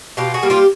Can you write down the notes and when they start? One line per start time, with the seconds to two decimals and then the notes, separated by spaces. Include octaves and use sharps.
0.17 B2 F4 G4
0.34 F#4 G#4
0.43 G3 A#3
0.50 F4 G4